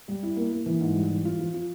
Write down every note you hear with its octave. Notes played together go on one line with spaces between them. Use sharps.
G3
E4
A#3
A#3
E3
G#2
G3
E3
F4
F3
F4